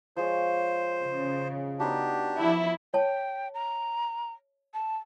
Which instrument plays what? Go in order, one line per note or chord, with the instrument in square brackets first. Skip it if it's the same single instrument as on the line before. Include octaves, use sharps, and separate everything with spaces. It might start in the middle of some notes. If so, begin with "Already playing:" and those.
[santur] F3 G#3 C#5 [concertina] C5
[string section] C#3
[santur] B3 D#4 F#4 [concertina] D4 G4
[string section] F3 E4 [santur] A5
[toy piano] C#5 A5 [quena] G5
[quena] A#5
A5